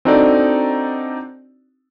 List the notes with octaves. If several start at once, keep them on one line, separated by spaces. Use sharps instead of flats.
C4 D4 D#4 F#4 A4 D5